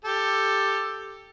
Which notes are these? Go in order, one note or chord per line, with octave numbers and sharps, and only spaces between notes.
G4 A4